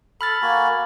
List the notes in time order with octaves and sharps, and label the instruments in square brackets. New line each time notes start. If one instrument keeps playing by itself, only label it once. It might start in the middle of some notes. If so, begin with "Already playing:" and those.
[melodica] A4 [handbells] B5 F6 A6
[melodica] A#3 F#4 G#5